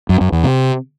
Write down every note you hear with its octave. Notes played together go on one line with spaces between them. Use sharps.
F#2
F#2
E2
C3